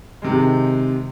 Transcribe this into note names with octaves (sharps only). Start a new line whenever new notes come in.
C3 D#3 G#3